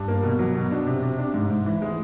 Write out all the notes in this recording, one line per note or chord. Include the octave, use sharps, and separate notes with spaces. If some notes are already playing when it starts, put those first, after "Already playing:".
Already playing: G2
A#3
B2
F#3
B2
D4
C3
C3
D4
G#2
G#2
E3
G#3